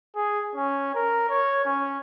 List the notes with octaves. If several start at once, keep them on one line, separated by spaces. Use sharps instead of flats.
G#4
C#4
A#4
C#5
C#4